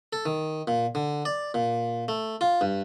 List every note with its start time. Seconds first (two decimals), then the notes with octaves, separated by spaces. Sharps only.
0.13 A4
0.26 D#3
0.68 A#2
0.95 D3
1.25 D5
1.54 A#2
2.08 A3
2.41 F4
2.61 G2